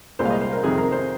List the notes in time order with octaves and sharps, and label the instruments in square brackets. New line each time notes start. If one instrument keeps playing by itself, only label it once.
[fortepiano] C2 A#2 G#3 C5
F5
D#5
C5
A#4
F2 C3 D#3 G#4
A#4
C5